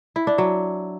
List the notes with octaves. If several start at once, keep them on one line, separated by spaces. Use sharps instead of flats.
E4
D4
F#3